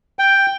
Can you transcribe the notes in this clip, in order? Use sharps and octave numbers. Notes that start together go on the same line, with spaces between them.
G5